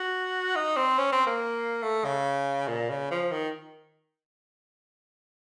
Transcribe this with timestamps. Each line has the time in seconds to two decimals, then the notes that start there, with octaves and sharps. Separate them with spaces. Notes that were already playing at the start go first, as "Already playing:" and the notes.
Already playing: F#4
0.55 D#4
0.77 C4
0.98 C#4
1.12 C4
1.27 A#3
1.83 A3
2.05 C#3
2.68 A#2
2.90 C#3
3.11 F3
3.32 D#3